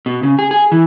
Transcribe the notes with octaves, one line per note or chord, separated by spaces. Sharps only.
B2
C#3
G#4
G#4
E3